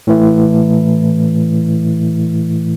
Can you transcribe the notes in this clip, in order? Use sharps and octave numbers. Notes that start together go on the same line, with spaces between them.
A2 E3 A3